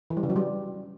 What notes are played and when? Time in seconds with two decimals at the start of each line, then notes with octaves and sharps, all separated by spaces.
0.10 E3
0.17 G3
0.23 C#3
0.30 F#3
0.36 G3